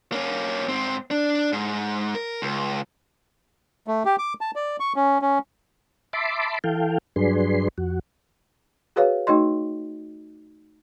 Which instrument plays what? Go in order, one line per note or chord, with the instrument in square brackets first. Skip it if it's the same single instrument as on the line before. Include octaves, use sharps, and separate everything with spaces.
[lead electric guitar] A#3 C#4
G#2 C4
D4
G#2
A#4
C#2
[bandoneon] A3
G4
D6
A5
D5
C#6
C#4
C#4
[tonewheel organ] E5 A5 B5 C6 D6
E3 A4 F5 G5
G2 F#3 D4 G#4 B4 C6
F2 F#4
[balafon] F#4 G#4 B4 C#5 F5
A3 D#4 F#4 D#5 C6